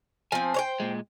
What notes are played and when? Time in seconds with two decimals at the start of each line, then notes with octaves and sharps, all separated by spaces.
0.32 F3 C4 G#5
0.54 C5 C#5 G5
0.80 A#2 G#3